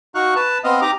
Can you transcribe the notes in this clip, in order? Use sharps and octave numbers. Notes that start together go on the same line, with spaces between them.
D#4 F#4 F5 C#6 F#6
B4 A5
B3 C4 D#5 F5
D#4 G4 D#5 A#5 D6